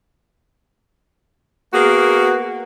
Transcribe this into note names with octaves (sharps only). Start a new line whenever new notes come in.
A#3 B3 F#4 G#4 A#4